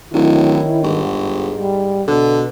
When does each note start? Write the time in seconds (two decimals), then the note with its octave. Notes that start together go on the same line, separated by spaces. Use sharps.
0.13 D1 D#3 C#4 D#4 E4
0.83 G1 G#2
1.58 G3
2.08 B2 D3